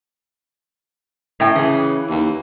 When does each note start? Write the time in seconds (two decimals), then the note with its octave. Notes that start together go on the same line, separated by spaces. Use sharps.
1.40 A2 G5
1.55 C#3 E3
2.10 D#2